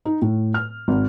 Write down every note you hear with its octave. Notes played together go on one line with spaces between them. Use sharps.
D#4
A2
F6
G#1